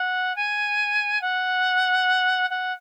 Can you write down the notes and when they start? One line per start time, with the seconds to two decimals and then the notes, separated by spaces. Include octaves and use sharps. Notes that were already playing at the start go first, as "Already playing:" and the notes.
Already playing: F#5
0.35 G#5
1.21 F#5
2.50 F#5